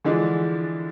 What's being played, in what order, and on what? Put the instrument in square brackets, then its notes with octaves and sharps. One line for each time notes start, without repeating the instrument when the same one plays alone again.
[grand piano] D3 E3 F3 G#3 D4